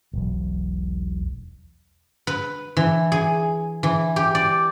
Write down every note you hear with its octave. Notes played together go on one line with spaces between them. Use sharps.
E1 B1
B4
E3
G#4
E3
G4
D5